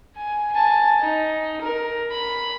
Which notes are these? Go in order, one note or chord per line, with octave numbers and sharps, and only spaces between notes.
G#5
G#5 A5
D#4
A#4
B5